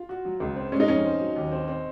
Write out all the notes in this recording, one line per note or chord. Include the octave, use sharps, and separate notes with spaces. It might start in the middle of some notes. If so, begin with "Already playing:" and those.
Already playing: F4
F#4
F#3
C#2
C4
G#3 C#4
D#4
F2 C#4
C4
F#3
D#2
C4
C4